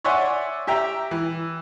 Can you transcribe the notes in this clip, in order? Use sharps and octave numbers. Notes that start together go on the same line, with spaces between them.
C#5 D5 E5 F#5 G#5 C6
G4 E5 G5 A#5
E3